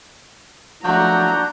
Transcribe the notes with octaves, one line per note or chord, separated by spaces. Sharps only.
F3 F#3 A3 D4 F#4 A#5 G6